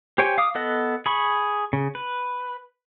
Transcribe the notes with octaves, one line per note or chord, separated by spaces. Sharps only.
G4 C5 C#5 G5 G#5
F5 D6 D#6
B3 A4 D#5 F#5
G#4 B5 C#6
C#3
B4